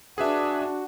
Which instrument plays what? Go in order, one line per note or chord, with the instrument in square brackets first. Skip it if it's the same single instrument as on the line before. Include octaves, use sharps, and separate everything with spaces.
[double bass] D4 [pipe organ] F#4 [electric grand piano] G#4 B4 E5